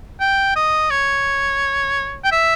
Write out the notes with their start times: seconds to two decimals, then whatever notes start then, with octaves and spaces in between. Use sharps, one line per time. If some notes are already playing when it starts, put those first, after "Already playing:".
0.20 G5
0.56 D#5
0.90 C#5
2.24 G5
2.32 E5